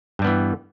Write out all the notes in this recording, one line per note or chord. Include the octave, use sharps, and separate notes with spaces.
G2 E3 G3 B3